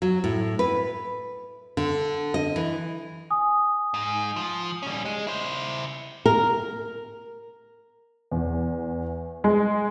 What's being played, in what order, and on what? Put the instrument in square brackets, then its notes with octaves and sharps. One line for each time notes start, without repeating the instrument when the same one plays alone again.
[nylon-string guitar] F#3
A2
B4
D3
D#5
E3
[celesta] G#5 D#6
[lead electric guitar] G#2
F3
G3 C#4
G#3
E4 C5
[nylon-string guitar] A#4
[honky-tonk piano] E2
G#3